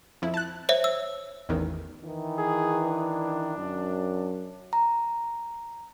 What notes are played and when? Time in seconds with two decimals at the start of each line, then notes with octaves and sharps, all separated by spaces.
0.22 F2 E4
0.34 A5 F#6
0.69 C5 C#5 E5
0.84 E6
1.49 A1 E2 D#3
2.04 D#3 E3
2.38 G#4
2.84 D4
3.57 F#2
4.73 A#5